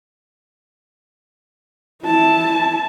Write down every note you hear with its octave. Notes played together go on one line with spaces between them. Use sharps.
E4 A5